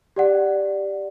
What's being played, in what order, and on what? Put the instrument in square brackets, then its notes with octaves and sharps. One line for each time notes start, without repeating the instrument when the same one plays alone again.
[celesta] G4 D5 F#5